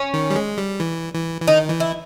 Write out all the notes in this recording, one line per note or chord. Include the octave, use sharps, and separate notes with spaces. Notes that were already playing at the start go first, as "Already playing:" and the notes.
Already playing: C#4
D#3
G3
G#3
G3
E3
E3
E3
D#3 D#4
E3
E4